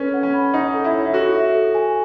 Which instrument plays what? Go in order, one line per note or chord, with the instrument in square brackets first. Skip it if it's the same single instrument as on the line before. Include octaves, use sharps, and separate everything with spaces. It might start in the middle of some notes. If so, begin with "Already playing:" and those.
Already playing: [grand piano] C#4 [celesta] A4 B4
[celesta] F#5
[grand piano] C#4
[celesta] B5
[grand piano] D#4 [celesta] F#5
[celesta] A4
[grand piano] E4
[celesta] C#5
[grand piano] E4
[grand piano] F#4 [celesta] A4
[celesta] E5
A4
G#5